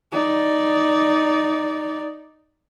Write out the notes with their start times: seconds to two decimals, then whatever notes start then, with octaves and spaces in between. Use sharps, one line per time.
0.12 D#4 D5